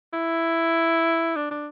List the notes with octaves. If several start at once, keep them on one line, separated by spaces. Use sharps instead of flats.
E4
D4
D4